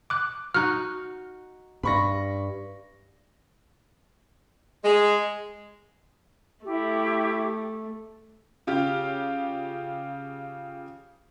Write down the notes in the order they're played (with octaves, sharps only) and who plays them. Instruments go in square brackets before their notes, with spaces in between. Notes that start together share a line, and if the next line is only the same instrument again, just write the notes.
[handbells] D6 F#6
[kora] D#4 F#4 [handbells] F6 F#6
[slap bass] G2 [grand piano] B5 C#6 A#6
[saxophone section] G#3
[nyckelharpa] A3 [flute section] E4 G4
[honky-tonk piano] C#3 F4 G4